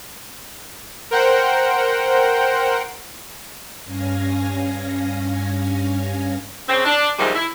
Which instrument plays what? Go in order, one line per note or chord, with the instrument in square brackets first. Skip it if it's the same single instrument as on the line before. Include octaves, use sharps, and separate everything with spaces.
[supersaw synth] A#4 C5 F#5 G5
[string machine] G2 C#4 F5 G#5 A#6
[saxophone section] C#3 C4
D4
D#2 G#2 C3 D#3 F3 G3
E4